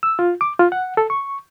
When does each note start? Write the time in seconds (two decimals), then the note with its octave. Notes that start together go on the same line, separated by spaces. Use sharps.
0.03 E6
0.19 F4
0.41 D6
0.59 F4
0.72 F#5
0.97 A4
1.10 C#6